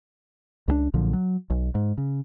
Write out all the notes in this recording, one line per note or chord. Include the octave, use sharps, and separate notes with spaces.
C#2 F3 D4
B1 A#2 D3 F3
F#3
B1
G#2
C#3